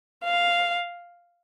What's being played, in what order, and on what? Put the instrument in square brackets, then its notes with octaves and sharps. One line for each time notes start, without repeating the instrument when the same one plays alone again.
[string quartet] F5